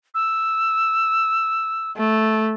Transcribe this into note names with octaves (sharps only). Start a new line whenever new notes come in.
E6
A3